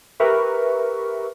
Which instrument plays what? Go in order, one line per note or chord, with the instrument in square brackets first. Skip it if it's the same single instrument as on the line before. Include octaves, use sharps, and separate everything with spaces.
[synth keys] G4 A#4 B4 E5 C#6